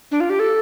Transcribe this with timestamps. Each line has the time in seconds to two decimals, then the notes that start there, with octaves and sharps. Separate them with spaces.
0.11 D4
0.20 F4
0.30 G4
0.40 A4